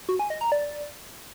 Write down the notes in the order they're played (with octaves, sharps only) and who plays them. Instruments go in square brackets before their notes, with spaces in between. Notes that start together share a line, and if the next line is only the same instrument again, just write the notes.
[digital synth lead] F#4
G#5
D#5
A#5
D5